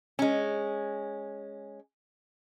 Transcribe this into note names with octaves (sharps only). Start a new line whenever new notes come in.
G#3 C#4